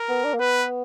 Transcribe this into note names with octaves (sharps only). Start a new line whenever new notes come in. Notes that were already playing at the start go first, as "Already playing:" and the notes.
Already playing: A#4
B3
D4
A#3
B3 B4